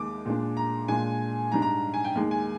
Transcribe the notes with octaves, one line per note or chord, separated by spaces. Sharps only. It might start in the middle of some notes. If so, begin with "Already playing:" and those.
Already playing: D#2 D#3 G#3 D6
A#2 G#3 D4
A#5
A#2 G#3 D4 G#5
G#2 G3 D4 A#5
A#5
G#5
G5
D#2 D#3 G#3
G#5